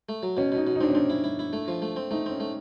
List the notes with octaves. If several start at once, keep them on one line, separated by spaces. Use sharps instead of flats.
A3
F#3
B2 C#4
B2
D#4
B2
D#4
C4 D4
C#4
C4 D4
E4
E4
E4
A3
F3
A3
C4
A3 D#4
C4 C#4
A3